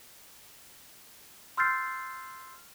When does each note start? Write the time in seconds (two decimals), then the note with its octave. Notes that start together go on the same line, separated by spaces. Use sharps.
1.57 C6 E6 F6 G6 A6 C7